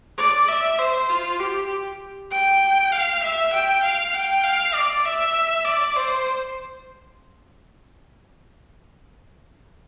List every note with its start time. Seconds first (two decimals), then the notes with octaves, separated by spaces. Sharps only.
0.18 D5
0.48 E5
0.79 C5
1.09 F4
1.40 G4
2.31 G5
2.92 F5
3.23 E5
3.53 G5
3.83 F5
4.14 G5
4.44 F5
4.74 D5
5.06 E5
5.65 D5
5.97 C5